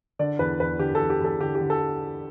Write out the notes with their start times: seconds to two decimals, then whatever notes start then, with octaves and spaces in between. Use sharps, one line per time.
0.19 D3 D5
0.39 E2 B4
0.60 E2 B4
0.79 D3 G4
0.95 A4
1.00 E2
1.10 G4
1.20 E2 A4
1.40 D3 G4
1.55 G4
1.61 D3
1.70 A4